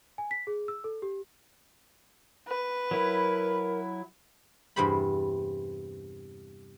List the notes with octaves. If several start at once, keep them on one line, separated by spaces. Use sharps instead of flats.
G#5
B6
G#4
E6
A4
G4
B4
F#3 E4 A#4
E2 G2 C3 G3 C5 B5